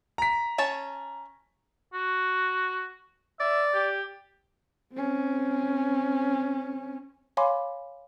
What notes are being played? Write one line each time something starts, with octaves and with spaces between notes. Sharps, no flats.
A#5 B6
C#4 C#5 A5
F#4
D5 E5
G4
C4 C#4
C#5 F5 G#5 B5 C6 D6